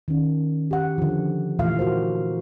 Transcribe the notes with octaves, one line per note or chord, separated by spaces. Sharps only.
D#3 C#4
G4 F#5
D3 F3
A#2 E3 A3 F4 E5 F5
F4 F#4 A#4 C5